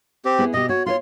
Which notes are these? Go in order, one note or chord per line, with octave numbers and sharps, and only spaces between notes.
C4 G4
B3 E4 G#4
B2 G4 D#5
F#4 C#5
F4 B4 C#5 C6